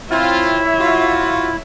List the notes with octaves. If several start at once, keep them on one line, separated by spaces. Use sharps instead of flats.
C4 E4 F4 C#5 E5
F4 F#4